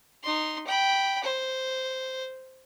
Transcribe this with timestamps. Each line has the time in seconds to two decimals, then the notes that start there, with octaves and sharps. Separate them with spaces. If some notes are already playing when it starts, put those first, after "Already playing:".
0.23 D#4 C6
0.67 G5 B5
1.23 C5